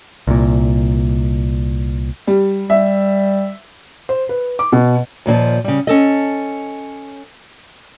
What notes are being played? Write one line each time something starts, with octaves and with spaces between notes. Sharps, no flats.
C2 A#2
G3
G3 E5
C5
B4
D6
B2
D#2 A#2 E3 F3
C#3 G3
C#4 A4 D#5